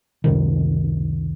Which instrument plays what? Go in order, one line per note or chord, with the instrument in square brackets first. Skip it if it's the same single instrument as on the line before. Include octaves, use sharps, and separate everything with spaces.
[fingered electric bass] C#2 F#2 C3 D#3